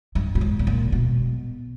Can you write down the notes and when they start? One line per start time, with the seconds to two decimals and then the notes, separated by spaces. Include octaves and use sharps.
0.15 G2
0.35 G2
0.41 G#2
0.59 B2
0.67 A#2
0.92 B2